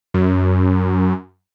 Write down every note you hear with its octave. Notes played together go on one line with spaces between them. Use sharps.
F#2